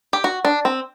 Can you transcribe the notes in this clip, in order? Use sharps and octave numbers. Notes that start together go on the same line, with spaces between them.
G4
F#4
D4
C4